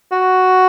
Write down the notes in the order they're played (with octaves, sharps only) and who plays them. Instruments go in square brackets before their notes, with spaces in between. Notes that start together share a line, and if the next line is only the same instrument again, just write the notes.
[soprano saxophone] F#4